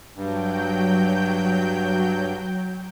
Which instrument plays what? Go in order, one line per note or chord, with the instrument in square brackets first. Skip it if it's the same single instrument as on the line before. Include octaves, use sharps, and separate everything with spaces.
[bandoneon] G2 [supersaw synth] F#3 G5 G6